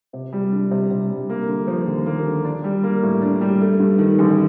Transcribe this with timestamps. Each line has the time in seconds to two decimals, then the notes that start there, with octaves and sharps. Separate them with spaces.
0.13 C3
0.33 G3
0.52 D4
0.71 C3
0.91 C3
1.10 G3
1.29 A#3
1.48 D3
1.67 F3
1.87 D#2
2.06 A#3
2.25 D3
2.45 D4
2.64 G3
2.83 A#3
3.03 A2
3.22 D4
3.41 G3
3.61 A3
3.79 G2
3.98 D#3
4.19 A1